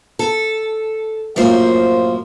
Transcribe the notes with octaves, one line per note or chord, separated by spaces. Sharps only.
A4
F#2 A2 F3 A#3 C5